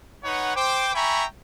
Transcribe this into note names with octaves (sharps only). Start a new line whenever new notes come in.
D#4 B4 C#5 F#5
C5 G5 D6
E5 G5 G#5 A#5 B5 C#6